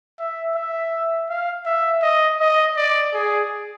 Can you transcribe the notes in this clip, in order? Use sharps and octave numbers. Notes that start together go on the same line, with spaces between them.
E5
E5
F5
E5
D#5
D#5
D5
G#4